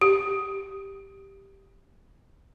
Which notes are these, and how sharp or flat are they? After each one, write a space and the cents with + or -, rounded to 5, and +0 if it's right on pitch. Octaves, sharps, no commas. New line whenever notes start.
G4 +0